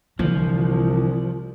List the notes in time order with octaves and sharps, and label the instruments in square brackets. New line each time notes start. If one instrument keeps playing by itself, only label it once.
[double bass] C2 [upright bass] D3 [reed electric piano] E3 [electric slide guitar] F3